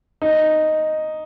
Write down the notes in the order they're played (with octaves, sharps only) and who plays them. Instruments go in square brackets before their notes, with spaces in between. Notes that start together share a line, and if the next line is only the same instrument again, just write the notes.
[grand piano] D#4